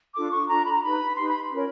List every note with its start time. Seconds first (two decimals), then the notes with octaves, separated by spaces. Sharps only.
0.14 D4 F4 A4 D6
0.32 C#6
0.49 D4 F4 A4 A#5
0.66 B5
0.74 A#5
0.83 D#4 G4 B4 B5
1.16 D#4 G4 B4 C6
1.28 B5
1.51 C#4 F4 A#4 C#5